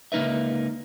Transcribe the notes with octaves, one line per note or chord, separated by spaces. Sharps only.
C#2 A#3 D#4 B4 E5